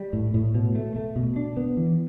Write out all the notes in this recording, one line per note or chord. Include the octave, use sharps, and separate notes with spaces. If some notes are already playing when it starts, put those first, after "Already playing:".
Already playing: G3
A2
A2
B2
A3
A3
B2
D4
B3
E3